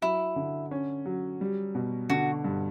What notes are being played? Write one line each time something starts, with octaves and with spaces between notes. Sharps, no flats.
F#3 E4
D3
C#4
F#3
G3
B2
D3 F#4
G2